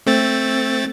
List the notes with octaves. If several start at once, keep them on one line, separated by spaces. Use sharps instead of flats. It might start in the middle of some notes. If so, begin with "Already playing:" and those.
A3 C4 A6